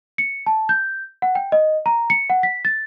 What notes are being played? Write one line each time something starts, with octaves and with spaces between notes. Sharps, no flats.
C#7
A5
G6
F#5
G5
D#5
A#5
C#7
F#5
B6
A6